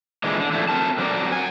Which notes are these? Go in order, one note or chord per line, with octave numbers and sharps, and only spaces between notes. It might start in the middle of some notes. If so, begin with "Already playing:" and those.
A#2 D3 E3 G#3
D3
D3 F3 G3 A3 E4
A3 C4 A#4 A5
D3 F#3 C4 D4 A#4 D5
F#5 G#5